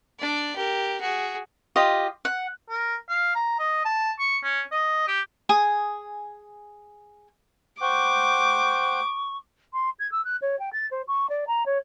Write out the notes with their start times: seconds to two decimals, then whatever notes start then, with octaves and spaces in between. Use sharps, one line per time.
0.20 D4 D5
0.56 G4 A#4
1.01 F#4 G#4
1.76 F4 G4 D#5
2.25 F#5
2.69 A#4
3.09 F5
3.35 A#5
3.59 D#5
3.85 A5
4.19 C#6
4.43 C#4
4.72 D#5
5.08 G4
5.49 G#4 G#5 D#6
7.81 C5 F#5 G5 C#6 D6
9.73 C6
9.99 G#6
10.12 E6
10.25 F#6
10.42 C#5
10.59 G5
10.73 A6
10.91 C5
11.08 C#6
11.30 D5
11.47 A#5
11.66 C#5